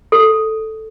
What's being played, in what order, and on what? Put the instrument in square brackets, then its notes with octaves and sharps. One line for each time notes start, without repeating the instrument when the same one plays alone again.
[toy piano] A4